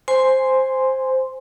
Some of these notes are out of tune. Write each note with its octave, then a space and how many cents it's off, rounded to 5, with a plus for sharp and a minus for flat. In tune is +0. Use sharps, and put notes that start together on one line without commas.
C5 +0 G#5 +0 C6 +0